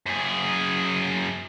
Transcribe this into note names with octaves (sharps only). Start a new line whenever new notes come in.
F#2 G#4